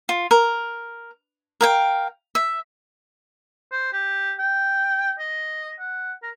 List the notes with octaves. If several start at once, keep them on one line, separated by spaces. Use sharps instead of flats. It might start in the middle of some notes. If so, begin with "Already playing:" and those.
F4
A#4
A#4 F5 G5
E5
C5
G4
G5
D#5
F#5
A#4